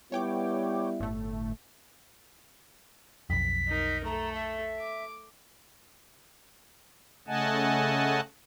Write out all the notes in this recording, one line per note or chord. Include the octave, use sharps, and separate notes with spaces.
G3 B3 E4 C#5 G5 D6
G1 A2 A3
B1 F2 B6
D#4 A#4
A3 A4 A#5
E5
D6
C#3 A3 D#5 F#5 G#5 A5